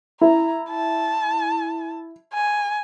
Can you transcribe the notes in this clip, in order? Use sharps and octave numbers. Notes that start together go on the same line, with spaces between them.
E4 A#5
A5
G#5